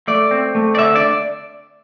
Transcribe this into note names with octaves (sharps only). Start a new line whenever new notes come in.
A3 D5
C4
A3
D5
D3 E5
D5